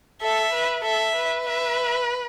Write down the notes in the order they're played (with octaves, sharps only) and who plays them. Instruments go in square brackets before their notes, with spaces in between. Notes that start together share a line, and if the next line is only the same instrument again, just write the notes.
[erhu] A4 [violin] E5
[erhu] B4
[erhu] A4 [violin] E5
[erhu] B4
[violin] E5